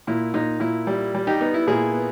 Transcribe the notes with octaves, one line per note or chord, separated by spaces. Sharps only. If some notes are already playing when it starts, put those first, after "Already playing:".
A#2 E4
A#2 D#4
A#2 E4
G3
G3
D#4 G4
B3 D#4
E4
A#2 E4 G#4
B3